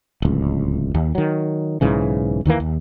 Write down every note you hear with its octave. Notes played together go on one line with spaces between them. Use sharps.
D1 C#2
D#2
D#3 F#3
B1 G#2 C#3 E3
D#2 D#3 E3 A#3
D#2